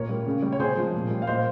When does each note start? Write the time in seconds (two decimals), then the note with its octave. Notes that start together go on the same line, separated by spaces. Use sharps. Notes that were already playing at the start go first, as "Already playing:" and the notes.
Already playing: A#2 A#4 C#5
0.09 G3
0.26 C#3
0.42 G3
0.52 C#5
0.59 C3 G#4 C5
0.77 F3 G#3
0.94 A#2
1.11 G3
1.22 F5
1.27 A#2 C5 D#5